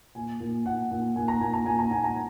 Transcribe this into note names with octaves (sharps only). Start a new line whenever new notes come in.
A#2 G#5
A#2
A#2 F#5
A#2
A#2 G#5
A#5
A#2 G#5
A#5
A#2 G#5
A#5
A#2 G#5
A#5